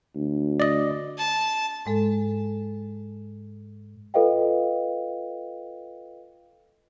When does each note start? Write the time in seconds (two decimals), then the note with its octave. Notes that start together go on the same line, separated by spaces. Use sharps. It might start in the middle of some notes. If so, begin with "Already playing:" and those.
0.15 D2
0.60 D5 D#5
1.18 A5
1.86 G#2 G#3 A4
4.14 F4 A4 B4 D#5 F5 G5